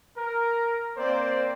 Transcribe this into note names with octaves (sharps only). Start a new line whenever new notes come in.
A#4
A#3 C4 C5 D5